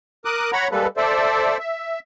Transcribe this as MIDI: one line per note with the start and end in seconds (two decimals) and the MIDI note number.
0.25 0.51 70
0.25 0.51 86
0.25 0.51 87
0.25 0.51 90
0.53 0.68 73
0.53 0.68 78
0.53 0.68 82
0.53 0.68 83
0.53 0.68 85
0.71 0.87 55
0.71 0.87 56
0.71 0.87 58
0.71 0.87 69
0.71 0.87 71
0.97 1.57 69
0.97 1.57 72
0.97 1.57 74
0.97 1.57 76
1.59 1.99 76